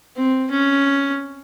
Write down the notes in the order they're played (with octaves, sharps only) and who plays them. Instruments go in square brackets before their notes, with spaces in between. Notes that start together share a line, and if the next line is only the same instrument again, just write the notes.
[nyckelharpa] C4
C#4